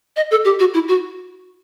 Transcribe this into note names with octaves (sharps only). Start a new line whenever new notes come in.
D#5
A4
G4
F#4
E4
F#4